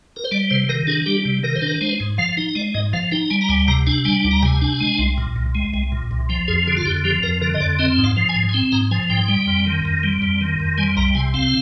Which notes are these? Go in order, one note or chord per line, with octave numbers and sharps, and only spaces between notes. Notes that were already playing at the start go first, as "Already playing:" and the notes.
A#4
C5
G3 D5
C3 C5
D#3 A#4
D4 G#4
G3 G4
C3
D#3 A#4
C5
D4 A#4
G#3 C5
G#2
F3 F5
D#4
G#3 D5
G#2 D#5
F3 F5
D#4 G5
G3 G#5
A#5
D2 G#5
C3 A#5
D4 G#5
G3 G#5
D2
A#5
C3 G#5
D4
G#3
C2
A#2
C2
G#3
C2
A#2
C2
F3 G5
F2 G#4
D3 G#4
F4
F2 G4
F3 G4
F2 A#4
D3 A#4
D#5
F2 D5
C4 D#5
G#2
F5
F3
G#5
G#2
G#5
C4 G5
G#2 A#5
F3 G#5
G#2 G5
G3
F2
D#3
F2
G3
F2
D#3
F2
G3 G#5
C2 A#5
C3 G#5
C4 F5